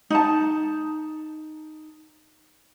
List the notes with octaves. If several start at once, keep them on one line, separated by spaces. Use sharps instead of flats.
D#4 A5